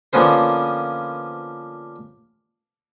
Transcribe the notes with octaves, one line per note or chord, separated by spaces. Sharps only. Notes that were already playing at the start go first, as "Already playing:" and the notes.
D3 F3 A#3 B3 C#4 C5